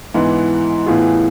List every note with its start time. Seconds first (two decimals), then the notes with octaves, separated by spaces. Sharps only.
0.14 G#2 E3 B3
0.86 A2 E3 B3 F4 G#4